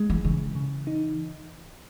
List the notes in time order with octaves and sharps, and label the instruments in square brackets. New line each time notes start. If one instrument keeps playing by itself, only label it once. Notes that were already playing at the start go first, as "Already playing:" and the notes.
Already playing: [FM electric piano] G#3
[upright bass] E3
[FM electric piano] C#3 [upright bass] E3
[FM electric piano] C#3
D#4